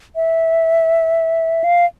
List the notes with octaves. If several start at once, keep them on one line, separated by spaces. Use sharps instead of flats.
E5
F5